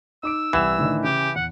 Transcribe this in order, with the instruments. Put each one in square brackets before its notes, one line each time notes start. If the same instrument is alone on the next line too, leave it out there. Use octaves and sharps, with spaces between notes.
[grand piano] D#4 D6 D7 [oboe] E6
[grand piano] C2 F#5 E7 [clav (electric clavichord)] E3
[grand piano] A2 D3 D#3
[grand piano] C#3 [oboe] G4
[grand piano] E2 [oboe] F#5